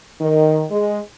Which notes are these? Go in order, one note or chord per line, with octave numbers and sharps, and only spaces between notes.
D#3
G#3